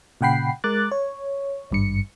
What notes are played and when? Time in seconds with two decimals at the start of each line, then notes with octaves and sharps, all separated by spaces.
0.21 A#2 C#3 F#5 G5 B5 C7
0.64 G#3 A#4 D6 F#6 A6
0.92 C#5
1.71 G#1 G2 C#7